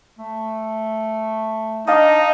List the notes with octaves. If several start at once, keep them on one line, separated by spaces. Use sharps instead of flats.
A3
D4 D#4 D#5 F5 A5 D#6